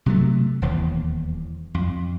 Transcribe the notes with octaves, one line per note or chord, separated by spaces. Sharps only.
C3 F#3 A3
D#1 E2
F2